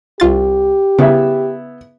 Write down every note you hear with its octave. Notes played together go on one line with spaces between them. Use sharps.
C2 F4 G4 A6
C#3 B3 E4 E5